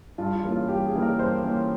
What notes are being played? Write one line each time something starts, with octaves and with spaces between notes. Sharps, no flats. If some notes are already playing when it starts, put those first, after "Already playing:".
G2 F4
F4
E3 A#3 C#4
F4
G2 G4
G#4
E3 A#3 C#4
A#4
G2 C5
E3 A#3 C#4